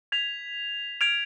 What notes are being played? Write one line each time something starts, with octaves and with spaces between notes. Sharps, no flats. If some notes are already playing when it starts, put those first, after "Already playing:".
G#6 B6 F7
F6 G#6 D7 F7